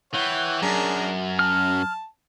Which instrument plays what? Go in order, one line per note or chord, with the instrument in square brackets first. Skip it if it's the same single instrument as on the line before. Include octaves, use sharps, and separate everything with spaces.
[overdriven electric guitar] E3 [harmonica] C#5 F#5 G5
[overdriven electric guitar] F#2 [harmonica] D4 G#4 A#4
[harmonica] A5 [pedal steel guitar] F6